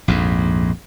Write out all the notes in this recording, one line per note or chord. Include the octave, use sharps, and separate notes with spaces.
A#1 F2 G#2